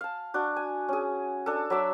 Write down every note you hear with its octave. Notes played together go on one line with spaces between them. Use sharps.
F5 A5
D4 F#4
G#5
C#4 G#4
D4 A4
F#3 E5 D6 E6